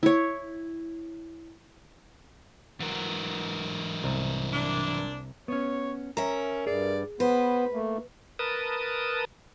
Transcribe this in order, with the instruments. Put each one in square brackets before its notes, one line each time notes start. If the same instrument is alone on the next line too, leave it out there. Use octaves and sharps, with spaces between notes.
[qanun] E4 C#5
[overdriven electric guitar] G#2 F#3 [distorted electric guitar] E3 A#4
[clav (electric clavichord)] C2
[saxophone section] A#2 D4
[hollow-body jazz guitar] B3 C#4 [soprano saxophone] C#5
[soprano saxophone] C#4 [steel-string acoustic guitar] A#4 E5 [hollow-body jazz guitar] A#5
[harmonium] G2 [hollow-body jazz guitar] G#4 [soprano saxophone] D5
[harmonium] B3 [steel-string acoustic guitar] B4 [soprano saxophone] C5
[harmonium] A3 [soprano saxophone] A#3
[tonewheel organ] A#4 B4 A5 D#6